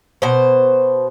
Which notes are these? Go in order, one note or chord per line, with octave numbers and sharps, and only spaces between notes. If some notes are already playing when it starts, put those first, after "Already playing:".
B2 C5